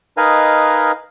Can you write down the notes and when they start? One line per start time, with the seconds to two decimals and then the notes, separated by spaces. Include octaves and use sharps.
0.17 D#4 A#4 B4 D#5 F5 G#5